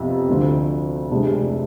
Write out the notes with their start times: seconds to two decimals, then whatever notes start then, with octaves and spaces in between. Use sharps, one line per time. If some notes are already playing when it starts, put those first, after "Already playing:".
Already playing: F2 C3 F3 B3
0.29 D2 D3 F3
1.10 F1 F2 C3 G#3 D4